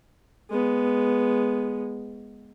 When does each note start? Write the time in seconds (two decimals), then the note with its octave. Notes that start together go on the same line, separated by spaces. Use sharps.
0.50 G#3 B3